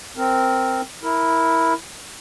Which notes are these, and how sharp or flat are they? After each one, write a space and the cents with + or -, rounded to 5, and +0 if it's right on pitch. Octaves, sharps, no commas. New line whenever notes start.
C4 +0 A#4 -5
E4 -5 A#4 +5